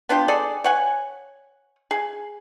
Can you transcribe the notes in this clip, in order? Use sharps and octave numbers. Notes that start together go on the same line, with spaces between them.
B3 D4 F4 G4
G#4 A4 D5
C#5 F#5 G#5
G#4